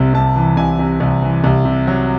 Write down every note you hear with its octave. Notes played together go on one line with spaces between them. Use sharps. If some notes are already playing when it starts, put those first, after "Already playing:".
Already playing: C2 C3
C2 A5
E3
C2 G#5
C3
C2
E3
C2
C3
F#3